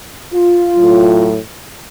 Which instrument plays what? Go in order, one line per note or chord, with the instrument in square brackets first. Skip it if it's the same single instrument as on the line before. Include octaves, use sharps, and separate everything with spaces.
[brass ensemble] F4
A2 F#3